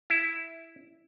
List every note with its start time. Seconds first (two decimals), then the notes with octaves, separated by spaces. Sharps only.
0.10 E4